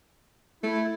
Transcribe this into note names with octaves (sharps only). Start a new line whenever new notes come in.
A3 E4